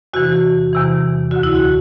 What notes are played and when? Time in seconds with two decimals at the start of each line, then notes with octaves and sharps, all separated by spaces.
0.13 E2 C3 E3 F#4
0.73 E2 C3 E3
1.31 D2 D3 F#4
1.43 E4
1.55 F#4